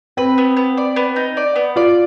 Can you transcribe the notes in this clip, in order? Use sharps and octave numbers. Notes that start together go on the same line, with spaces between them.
C4 B4
B3
B3
D5
B3
D#4
D5
B3
F4 D5